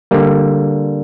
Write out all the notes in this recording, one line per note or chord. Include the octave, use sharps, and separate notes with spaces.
D3 G3 A#3